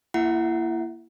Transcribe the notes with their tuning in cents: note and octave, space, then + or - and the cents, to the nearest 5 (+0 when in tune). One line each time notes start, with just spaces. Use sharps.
A#3 +10 E4 +25 F#5 +0